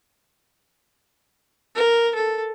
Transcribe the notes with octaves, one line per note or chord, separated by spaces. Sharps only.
A#4
A4